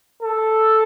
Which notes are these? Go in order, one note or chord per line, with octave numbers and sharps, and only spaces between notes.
A4